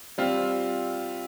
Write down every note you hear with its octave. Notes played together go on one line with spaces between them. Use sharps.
G3 C4 F4